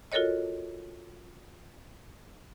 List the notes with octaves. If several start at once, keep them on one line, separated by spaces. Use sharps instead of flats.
F4 F#4 A4 A#4 C#5 D#5